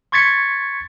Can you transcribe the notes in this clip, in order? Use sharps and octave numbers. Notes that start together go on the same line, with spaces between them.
C6 C#6 G#6 A6 B6 C#7